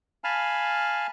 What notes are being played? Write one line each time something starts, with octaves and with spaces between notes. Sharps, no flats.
F5 G#5 A5 B5 F6